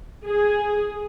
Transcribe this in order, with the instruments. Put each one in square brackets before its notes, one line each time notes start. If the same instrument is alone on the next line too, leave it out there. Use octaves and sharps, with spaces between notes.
[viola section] G#4